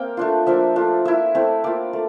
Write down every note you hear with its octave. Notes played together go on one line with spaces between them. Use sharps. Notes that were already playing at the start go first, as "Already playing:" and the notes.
Already playing: A#3 C4 A#4 G5 A#5
A3 D4 F4
F3 A#3 D4 E5
A3 D4 F4
A#3 E4 E5
A3 C4 E4
A#3 F4 D5
A3